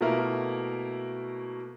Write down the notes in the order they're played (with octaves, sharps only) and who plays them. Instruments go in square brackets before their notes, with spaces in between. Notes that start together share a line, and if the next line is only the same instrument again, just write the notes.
[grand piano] B2 A3 A#3 E4 A#4